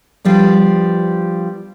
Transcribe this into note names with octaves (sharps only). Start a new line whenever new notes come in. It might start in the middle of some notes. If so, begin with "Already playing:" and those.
F3 G3 B3 D4